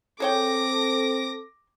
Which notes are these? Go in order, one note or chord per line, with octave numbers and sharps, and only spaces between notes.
C4 G#4 A4 C#5 G5 D6 A#6